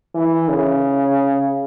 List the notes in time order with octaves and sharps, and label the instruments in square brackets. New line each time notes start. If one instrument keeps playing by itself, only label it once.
[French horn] E3
C#3